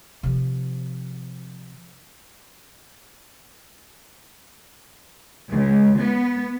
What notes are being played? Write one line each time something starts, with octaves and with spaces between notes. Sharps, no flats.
C3 F3
C#2
B3